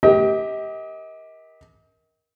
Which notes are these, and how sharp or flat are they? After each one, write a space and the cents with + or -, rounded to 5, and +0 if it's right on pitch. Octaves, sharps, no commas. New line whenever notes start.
G4 +0 A#4 +15 D#5 +35